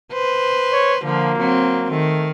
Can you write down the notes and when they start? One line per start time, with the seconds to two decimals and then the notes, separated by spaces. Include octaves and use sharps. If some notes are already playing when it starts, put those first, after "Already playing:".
0.12 B4 C5
0.73 C#5
1.04 D3 F3 A#3
1.38 F#3 C4
1.91 D#3 A3